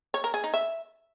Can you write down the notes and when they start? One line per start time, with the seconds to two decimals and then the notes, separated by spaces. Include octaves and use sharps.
0.14 C#5
0.24 A#4
0.34 G#4
0.44 D#4
0.54 E5